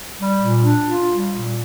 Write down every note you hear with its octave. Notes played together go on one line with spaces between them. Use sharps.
G3
A#2
D4
F4
G3
A#2